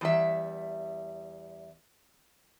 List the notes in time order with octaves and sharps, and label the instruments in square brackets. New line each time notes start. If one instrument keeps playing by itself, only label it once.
[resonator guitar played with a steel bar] E2 G3 E5